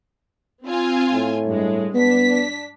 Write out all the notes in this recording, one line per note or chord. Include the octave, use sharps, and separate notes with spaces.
C4 F4 G#5
A2
G2 G#3
B3 D4 B6